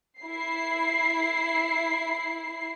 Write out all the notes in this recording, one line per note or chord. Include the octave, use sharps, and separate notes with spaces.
E4 C7